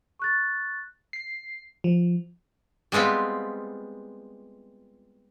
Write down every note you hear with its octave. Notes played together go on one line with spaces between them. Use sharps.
C#6 F#6 A6
C7
F3
G3 G#3 B3 C4 F4